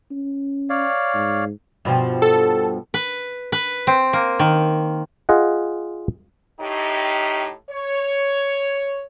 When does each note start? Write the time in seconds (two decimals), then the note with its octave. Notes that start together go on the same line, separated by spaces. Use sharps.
0.11 C#4
0.70 C#5 D5 F5
1.14 G#2
1.85 G2 B2 F3
2.22 A4
2.94 B4
3.52 B4
3.87 C4
4.13 A#3
4.39 D#3
5.29 F4 G#4 D#5 F#5
6.60 A2 D#4 G4
7.70 C#5